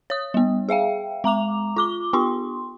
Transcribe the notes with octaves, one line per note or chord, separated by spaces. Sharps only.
C#5 D#6
G3 B3
G#4 E5 F5 G5
G#3 A#5 D6 F7
F4 D6 G7
B3 F4 G4 C6